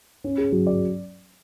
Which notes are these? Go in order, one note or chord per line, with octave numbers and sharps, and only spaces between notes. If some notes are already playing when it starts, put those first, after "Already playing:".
C#4
G#4
F#3
D5